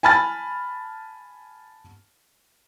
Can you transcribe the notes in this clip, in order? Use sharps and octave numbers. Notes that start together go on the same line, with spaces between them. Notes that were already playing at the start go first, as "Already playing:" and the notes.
G#5 A5 B5 F6 A6